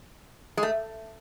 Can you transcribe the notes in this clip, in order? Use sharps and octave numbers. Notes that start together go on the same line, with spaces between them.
G#3
A3